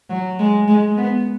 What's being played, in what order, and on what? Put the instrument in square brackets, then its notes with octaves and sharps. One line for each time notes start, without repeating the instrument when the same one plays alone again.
[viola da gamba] F#3
G#3
G#3
B3